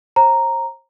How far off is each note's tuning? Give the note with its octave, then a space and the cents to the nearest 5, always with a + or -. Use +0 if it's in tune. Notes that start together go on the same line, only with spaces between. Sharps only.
C5 +40 A#5 +0